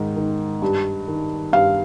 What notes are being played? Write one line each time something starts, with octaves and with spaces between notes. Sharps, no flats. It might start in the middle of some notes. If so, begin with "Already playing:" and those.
Already playing: G#2 D#3
D#3
G2
D#3
G2 F5